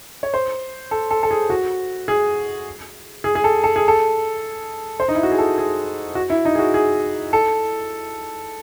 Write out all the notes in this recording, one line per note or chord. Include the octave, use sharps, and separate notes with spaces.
C#5
C5
A4
A4
A4
G#4
F#4
G#4
G#4
G#4
A4
A4
G#4
A4
C5
D#4
E4
F#4
G#4
A4
G#4
F#4
E4
D#4
G#4
F#4
G#4
A4